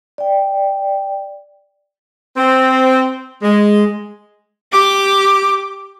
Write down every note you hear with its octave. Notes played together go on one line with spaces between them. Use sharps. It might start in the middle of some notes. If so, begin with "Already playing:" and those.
D5 G5
C4
G#3
G4 D6